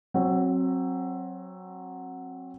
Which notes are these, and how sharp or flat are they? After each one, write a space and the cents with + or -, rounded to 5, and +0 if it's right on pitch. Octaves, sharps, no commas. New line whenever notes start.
F#3 +0 C4 +25